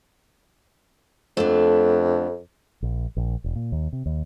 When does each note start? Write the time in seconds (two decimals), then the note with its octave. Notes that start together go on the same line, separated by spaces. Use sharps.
1.37 F2 A3 B3 D4
2.82 A#1
3.17 A#1
3.44 E1
3.56 A#2
3.72 D#2
3.93 C3
4.06 D#2